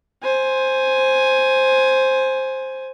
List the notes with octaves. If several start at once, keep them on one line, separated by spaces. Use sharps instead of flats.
C5 G#5